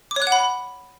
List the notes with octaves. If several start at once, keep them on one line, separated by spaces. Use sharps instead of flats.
D6
C#5
F#6
F#5
B5